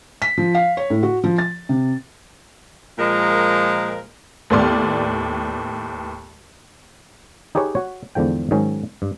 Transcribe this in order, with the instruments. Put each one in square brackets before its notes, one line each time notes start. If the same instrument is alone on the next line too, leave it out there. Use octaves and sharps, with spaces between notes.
[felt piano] B6
F3
F5
C#5
A2
F#4
F3
A6
C3
[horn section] A#2 F3 G#3 A#4
[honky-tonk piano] D#2 A2 B3 D5 C6 F6
[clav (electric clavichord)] D#4 G4 G#4 B4 C#5
F#4 C#5
E2 G#2 D3 F3 G5
G#2 D#3 F#3 C#4
G2